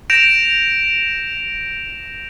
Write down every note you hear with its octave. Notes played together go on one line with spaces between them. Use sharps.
G6 A#6 D7 E7 F7